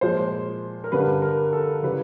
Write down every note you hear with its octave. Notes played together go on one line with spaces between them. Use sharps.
A#2 F3 G#3 C5
A#4
G2 D3 G3 B4
A#4
A4
C#3 E3 G3 B4